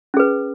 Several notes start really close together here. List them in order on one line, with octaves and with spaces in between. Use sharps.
C#4 G#4 B4